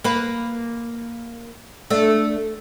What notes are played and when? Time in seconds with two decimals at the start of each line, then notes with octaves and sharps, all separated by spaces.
0.04 A#3 B4
1.90 A3 D4